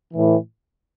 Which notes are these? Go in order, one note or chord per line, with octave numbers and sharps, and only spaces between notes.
A2 E3